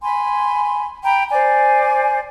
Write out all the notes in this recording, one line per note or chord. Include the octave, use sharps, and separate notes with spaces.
G#5 B5 C6
G5 A#5 B5
C5 D5 G#5